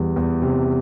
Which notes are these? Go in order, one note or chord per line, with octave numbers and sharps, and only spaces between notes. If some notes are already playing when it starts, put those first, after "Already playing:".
Already playing: E2 G3
E2
C3